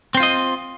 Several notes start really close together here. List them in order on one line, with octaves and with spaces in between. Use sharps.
C4 C5 F4 D#5